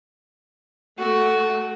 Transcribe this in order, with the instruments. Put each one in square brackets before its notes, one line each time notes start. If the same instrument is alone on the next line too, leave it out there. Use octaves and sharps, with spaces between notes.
[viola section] A3 [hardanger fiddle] F#4